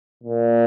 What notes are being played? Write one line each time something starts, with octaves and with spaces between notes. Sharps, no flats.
A#2